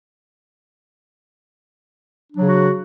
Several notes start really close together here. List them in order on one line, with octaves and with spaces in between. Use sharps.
D4 F#3 C#3 F#4